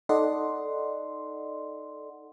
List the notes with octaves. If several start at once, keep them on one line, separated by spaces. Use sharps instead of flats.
D#4 A4 D5 D#5 F#5 C6